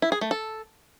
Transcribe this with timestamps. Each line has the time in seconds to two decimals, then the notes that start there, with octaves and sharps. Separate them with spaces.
0.02 E4
0.12 G#4
0.21 A3
0.31 A4